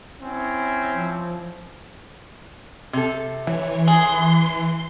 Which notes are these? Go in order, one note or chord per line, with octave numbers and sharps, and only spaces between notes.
C4 C#4 E4
F3
C3 A4
E3 C#5
G#4 C6